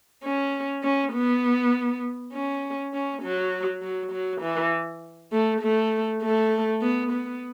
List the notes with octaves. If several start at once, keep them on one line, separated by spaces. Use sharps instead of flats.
C#4
C#4
B3
C#4
C#4
F#3
F#3
F#3
E3
A3
A3
A3
B3
B3